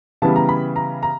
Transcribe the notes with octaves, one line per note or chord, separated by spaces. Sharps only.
C#3 E3 G3 B3 A5
A#5
B5
A#5
A#5